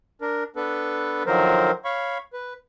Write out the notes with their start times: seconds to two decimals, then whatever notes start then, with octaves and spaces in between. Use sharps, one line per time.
0.21 D4 A#4
0.56 B3 D4 A4 B4
1.26 D3 D#3 F3 F#3 A#4 C5
1.85 C#5 F5 B5 C#6
2.33 B4